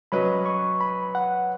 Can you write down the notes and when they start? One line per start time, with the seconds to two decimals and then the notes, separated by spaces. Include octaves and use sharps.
0.12 F#3 C#4 B4 D#5 B5
0.46 C#6
0.81 B5
1.15 F#5